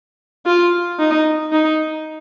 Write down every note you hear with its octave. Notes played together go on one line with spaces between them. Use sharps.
F4
D#4
D#4